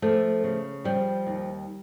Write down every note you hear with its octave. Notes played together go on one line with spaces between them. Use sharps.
F3 A3
C#3
F3 G3
D#2